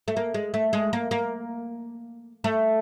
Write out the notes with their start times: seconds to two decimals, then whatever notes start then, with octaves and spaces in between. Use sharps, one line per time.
0.08 A3
0.17 A#3
0.34 G#3
0.54 A3
0.73 G#3
0.93 A#3
1.11 A#3
2.44 A3